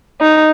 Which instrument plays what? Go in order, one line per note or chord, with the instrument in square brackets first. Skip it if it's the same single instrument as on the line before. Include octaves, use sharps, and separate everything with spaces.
[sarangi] D#4